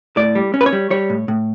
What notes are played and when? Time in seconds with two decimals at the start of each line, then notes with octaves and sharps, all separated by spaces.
0.17 A2 D5
0.35 G3
0.54 C#4
0.61 B4
0.66 C#5
0.73 G3
0.90 G3 C#5
1.10 A2
1.28 A2